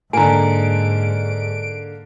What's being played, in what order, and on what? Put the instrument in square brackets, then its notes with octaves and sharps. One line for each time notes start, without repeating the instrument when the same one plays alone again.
[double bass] G#2 [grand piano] D3 A#3 [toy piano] G#5 A#5 [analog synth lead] D7